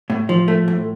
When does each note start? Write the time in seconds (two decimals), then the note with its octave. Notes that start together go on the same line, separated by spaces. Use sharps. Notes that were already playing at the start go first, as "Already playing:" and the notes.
0.10 A2
0.29 F3
0.48 A3
0.68 A2